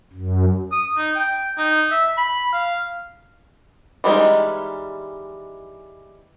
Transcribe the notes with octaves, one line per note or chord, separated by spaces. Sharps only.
F#2
D#6
D#4
G5
D#4
E5
B5
F5
E3 G3 G#3 C#4 D#4